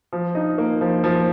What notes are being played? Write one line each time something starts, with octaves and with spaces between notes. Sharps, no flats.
F3
D#4
A#3
F3
F3